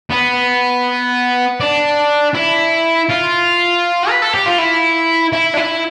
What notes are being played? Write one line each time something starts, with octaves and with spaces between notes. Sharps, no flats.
B3
D4
E4
F4
B4
A4
G4
F4
E4
E4
D4
E4